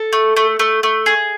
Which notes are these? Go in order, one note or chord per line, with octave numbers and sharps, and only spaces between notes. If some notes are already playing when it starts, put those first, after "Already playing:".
Already playing: A4
A3
A3
A3
A3
G#4